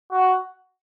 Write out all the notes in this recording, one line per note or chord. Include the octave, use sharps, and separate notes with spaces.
F#4